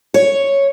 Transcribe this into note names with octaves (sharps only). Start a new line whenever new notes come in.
C#5